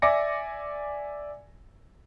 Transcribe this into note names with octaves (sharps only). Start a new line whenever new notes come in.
D5 E5 G#5 D6 A#6 C#7